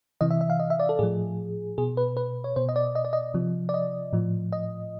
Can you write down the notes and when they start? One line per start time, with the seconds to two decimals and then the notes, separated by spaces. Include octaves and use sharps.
0.21 C3 E3 D#5
0.30 E5
0.41 E5
0.50 F5
0.59 D#5
0.70 E5
0.79 D5
0.89 A4
0.99 A2 F3 G#4
1.78 B2 G#4
1.97 B4
2.17 B4
2.44 C#5
2.56 B2 C5
2.69 D#5
2.76 D5
2.95 D#5
3.05 D5
3.13 D#5
3.34 C3 F3
3.69 D5
3.74 D#5
4.13 A2 F3
4.52 D#5